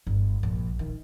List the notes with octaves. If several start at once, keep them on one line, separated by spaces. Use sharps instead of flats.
G1
A#1
D#3